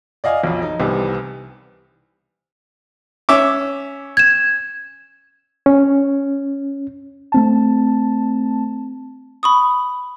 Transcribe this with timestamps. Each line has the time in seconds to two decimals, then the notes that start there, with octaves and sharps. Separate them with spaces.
0.24 D5 D#5 F5 G#5
0.44 B1 F2
0.62 D#4
0.80 C2 C3 D#3 E3 B3
3.29 C#4 E5 D6
4.17 G#6 E7
5.66 C#4
7.32 A3 C4 A5
9.43 B5 C#6 D#6